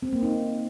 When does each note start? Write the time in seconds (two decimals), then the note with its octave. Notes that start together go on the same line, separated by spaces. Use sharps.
0.03 C4
0.13 A#3
0.23 D#4